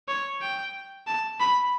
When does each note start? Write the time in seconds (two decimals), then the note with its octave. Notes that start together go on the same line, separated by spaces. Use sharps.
0.08 C#5
0.41 G5
1.07 A5
1.40 B5